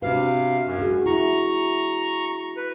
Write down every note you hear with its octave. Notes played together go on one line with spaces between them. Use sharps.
C3 D4 F#4 B4 F5
F#2
F#4 G#4
E4 A#5 C#6
B4